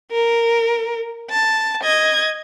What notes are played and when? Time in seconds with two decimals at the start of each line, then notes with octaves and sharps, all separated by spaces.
0.11 A#4
1.30 A5
1.83 D#5 G#6